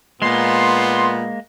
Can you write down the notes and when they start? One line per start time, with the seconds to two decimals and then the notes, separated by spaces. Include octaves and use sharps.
0.22 A#2 G#3 A#3 B3 C6